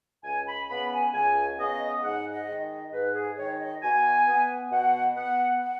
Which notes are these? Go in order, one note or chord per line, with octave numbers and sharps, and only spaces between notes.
C#2 G#5
B5
C#3 B3 B5
G#5
C#2 G#5
C#3 B3 D#5
G#2 F#5
D#5
D#3 G#3
D#5
G#2 B4
G#4
D#3 G#3 C#5
D#5
B2 G#5
B3
B2 F#5
B3 F#5
F#5